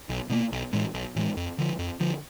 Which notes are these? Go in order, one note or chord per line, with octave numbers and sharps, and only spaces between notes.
B1
B2 G3 A#3
B1
A2 E3 G#3
B1
A2 E3 G#3
F2
D3 F3
F2
D3 F3